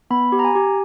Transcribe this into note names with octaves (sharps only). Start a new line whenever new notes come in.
B3 B5
G4
A#5
G#5
G4